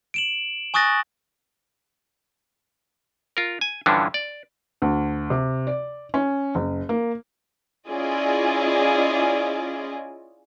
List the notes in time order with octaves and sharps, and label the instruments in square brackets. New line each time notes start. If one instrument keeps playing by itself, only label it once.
[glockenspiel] D7 E7 F#7
G#5 C#6 D#6 F#6 A6 A#6
[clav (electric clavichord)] F4 A#4
G#5
G2 D3 E3 F3 C#4 D4
D5
[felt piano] D2
C3
D5
C#4
F#1
A#3
[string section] C#4 E4 F4 G#4 D5 D#5